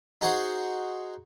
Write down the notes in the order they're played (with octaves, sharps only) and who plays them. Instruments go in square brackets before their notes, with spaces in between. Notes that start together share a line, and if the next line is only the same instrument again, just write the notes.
[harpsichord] D#4 F#4 G#4 C5 F#5